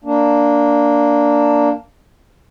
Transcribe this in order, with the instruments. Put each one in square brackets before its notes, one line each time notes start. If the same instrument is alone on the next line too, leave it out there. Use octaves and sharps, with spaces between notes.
[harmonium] A#3 D4